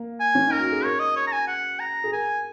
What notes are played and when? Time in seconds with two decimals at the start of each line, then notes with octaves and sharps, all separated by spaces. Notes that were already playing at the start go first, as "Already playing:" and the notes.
Already playing: A#3
0.20 G#5
0.35 C#4
0.47 D#4 A#4
0.60 F#4
0.72 G#4
0.84 A#4 C#5
0.99 D#5
1.16 C#5
1.27 A#5
1.32 G#5
1.48 F#5
1.80 A#5
2.04 G#4
2.12 A#4 G#5